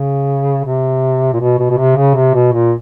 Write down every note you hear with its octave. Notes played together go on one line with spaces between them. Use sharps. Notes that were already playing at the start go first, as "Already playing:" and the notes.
Already playing: C#3
C3
A#2
B2
B2
B2
C3
C#3
C3
B2
A#2